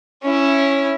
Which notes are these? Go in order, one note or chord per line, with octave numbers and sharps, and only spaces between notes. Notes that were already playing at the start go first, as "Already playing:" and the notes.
C#4 E4